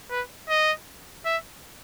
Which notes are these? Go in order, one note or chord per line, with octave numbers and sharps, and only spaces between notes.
B4
D#5
E5